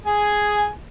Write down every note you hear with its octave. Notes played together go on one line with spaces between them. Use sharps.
G#4 G#5